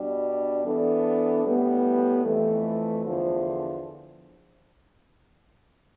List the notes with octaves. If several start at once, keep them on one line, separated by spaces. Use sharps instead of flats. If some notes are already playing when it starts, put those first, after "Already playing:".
Already playing: B2 G3 D4
E3 B3 D4 A4
A2 G3 B3
F2 E3 A3
E2 D3 F3